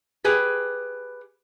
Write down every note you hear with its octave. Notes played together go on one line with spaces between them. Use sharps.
G4 G#4 B4